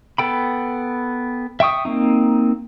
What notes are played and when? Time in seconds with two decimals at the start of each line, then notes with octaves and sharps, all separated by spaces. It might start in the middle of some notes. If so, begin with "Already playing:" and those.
0.18 B3 A4 G5 B5
1.60 E5 G5 C#6 D#6
1.85 A#3 C4 D#4